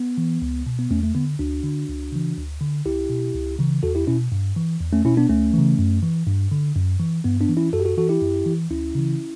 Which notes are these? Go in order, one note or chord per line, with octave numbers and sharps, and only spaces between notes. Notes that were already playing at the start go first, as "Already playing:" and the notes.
Already playing: B3
E3
C#2
B2
B3
E2 A3 C#4
A3
D3 B3
D2 D4 F#4
D3
C#2
C#3 E3
D2
D3
C#2 E4 G4
B2
C#2
C#3 E3
E2 F#4 A4
E4 G4
B2 C#4 E4
G2
E3
E2
A3 C#4
B2 C#4 E4
B3 D4
D2 A3 C#4
C#3 E3
F#2
E3
G2
D3
F#2
E3
G2 B3
B3 D4
E3
C#4 E4
F#2 F#4 A4
G4
F#4 A4
E3 F#4 A4
E4 G4
F#2
E3
D2 C#4 E4
C#3 E3